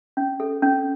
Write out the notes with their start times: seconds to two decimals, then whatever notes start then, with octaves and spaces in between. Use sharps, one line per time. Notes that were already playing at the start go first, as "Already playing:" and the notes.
0.17 C#4
0.40 A4
0.63 C#4